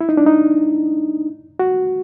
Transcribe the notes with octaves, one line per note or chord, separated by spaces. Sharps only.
E4
D#4
D4
D#4
F#4